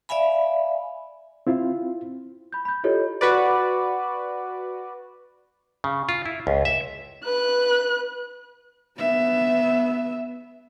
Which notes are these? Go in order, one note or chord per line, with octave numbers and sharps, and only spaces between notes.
D5 E5 F5 G#5 B5
C4 E4 F4
B5 G6
B5 G6
E4 F4 G4 A4 C#5 D#5
F#4 B4 D5
C#3
F4
E4
C#2
E5
B4 F#6
B3 E5